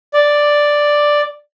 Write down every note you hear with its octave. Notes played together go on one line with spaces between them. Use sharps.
D5